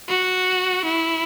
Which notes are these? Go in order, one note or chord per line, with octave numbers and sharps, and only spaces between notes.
F#4
E4